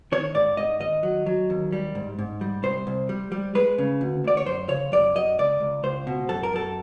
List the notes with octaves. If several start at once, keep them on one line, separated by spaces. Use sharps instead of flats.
D#3 C#5
G#2 D5
G#2 D#5
D#2 D#5
F#3
F#3
D#2
G3
G#2
G#2
G3
C2 C5
C2
G3
G3
G#3 B4
C#3
D2
D2 D5
C#5
F#2 C5
C#3 C#5
F#2 D5
F#2 D#5
C#2 D5
C#2
C#2 C5
B2
F#2 A4
A#4
F#2 A4